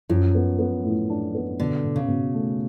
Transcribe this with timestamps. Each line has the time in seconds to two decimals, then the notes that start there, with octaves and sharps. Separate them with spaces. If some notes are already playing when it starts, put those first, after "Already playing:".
0.09 F#2 F3
0.35 B3
0.59 B3
0.85 A2
1.10 D4
1.35 B3
1.59 B2 D3
1.84 B2
1.96 C#3
2.08 B2
2.34 A3